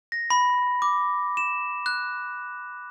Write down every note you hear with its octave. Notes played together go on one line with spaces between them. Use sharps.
A#6
B5
D6
E7
F#6